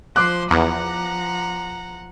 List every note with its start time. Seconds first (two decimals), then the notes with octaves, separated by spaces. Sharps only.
0.16 F3 C5 C6 D6 F#6
0.51 E2 F3 F#5 A#5